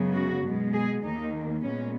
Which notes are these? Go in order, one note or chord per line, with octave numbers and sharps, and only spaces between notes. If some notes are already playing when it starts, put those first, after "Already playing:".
Already playing: F#2 C#3 G#3 B3
F#4
B2 G#3 B3
G#4
D#2 D#3 A#3 D#4
A#2 G#3 B3 C#4